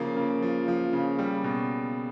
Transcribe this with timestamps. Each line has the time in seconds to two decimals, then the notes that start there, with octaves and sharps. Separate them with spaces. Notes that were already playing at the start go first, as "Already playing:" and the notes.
Already playing: C#3 F3 A#3
0.17 C#3
0.42 F3
0.68 F3
0.93 C#3
1.19 G3
1.44 B2